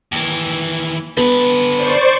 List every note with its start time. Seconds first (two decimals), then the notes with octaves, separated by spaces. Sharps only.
0.12 D#2 E3
1.17 D3 B3 B4
1.75 C5 D5 C#6